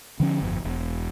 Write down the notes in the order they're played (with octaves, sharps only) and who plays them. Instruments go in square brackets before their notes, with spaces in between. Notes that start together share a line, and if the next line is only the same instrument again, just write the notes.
[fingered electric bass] D3 F3 C#4
G1 F2
E1